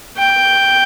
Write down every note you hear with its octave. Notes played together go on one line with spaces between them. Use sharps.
G5